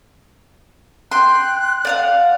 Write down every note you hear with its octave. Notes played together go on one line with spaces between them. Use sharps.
G5 C6 F#6
D5 F5 F#5